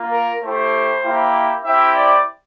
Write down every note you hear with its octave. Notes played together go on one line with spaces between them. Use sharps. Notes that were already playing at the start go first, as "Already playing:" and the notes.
Already playing: A#3 F4
A#4
A3 E4 G4 C5
A#3 E4 G4
C4 E4 G4 E5
D5